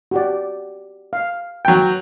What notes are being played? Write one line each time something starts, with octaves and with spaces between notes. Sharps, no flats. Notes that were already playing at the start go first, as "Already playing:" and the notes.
F#4 G4 D5
F5
F#3 G5